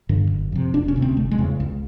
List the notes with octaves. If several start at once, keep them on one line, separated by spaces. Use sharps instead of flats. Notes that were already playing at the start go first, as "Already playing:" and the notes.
G2 D3
F#1
F2 C3
E1 D4
C#4
D2 C3
C4
F#1 A3
G#3
E2 C#3
C#2